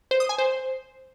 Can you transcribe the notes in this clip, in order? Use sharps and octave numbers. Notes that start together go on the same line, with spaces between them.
C5
D#6
G#5
C5